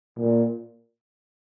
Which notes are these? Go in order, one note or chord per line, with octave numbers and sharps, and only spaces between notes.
A#2